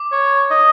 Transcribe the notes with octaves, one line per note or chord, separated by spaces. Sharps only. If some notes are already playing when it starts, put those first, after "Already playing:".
Already playing: D6
C#5
D#5